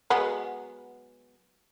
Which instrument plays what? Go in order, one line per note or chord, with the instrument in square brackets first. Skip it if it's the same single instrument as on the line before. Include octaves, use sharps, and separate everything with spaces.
[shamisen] F#3 G#3 B3